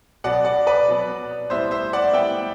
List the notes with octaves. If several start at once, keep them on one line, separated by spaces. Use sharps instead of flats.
B2 F#3 B3 D5 F#5
D5 F#5
B4 D5
B2 F#3 B3
A2 G3 B3 C5 E5
C5 E5
D5 F#5
A2 G3 B3 E5 G5